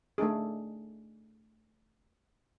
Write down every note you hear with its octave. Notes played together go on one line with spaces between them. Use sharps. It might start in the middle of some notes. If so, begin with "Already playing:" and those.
A3 D4 D#4 G#4